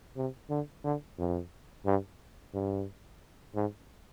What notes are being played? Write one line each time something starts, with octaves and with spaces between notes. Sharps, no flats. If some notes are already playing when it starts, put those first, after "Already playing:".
C3
D3
D3
F2
G2
G2
G#2